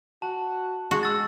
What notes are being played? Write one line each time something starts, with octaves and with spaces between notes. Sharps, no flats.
F#4 A5
G#3 F#4
E6 A6